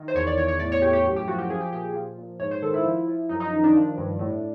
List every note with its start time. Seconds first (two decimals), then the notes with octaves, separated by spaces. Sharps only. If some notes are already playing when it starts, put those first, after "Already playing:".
Already playing: D#3
0.08 C5
0.15 E2 C#5
0.27 D5
0.38 E2 C#5
0.48 C#5
0.59 A2 D5
0.72 C#5
0.82 A2 G4
0.93 G4
1.05 F#2
1.16 G4
1.28 F3 F#4
1.38 G4
1.50 F3 G#4
1.61 G4
1.72 A#2 G4
1.94 F3
2.18 A#2
2.40 G#2 C#5
2.51 C5
2.62 D#3 A4
2.74 E4
2.85 F3
3.08 F3
3.29 F#2 D#4
3.40 D#4
3.53 D#3
3.64 D4
3.75 F3
3.98 G2
4.19 A2